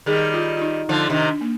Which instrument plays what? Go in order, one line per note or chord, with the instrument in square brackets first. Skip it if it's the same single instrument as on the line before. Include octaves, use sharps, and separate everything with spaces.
[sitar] D#3 G3 [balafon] G#4
[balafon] F4
F4
D#4
[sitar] D3 F3 [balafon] D#4
[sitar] C3 D#3 [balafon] D4
[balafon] D4
A#3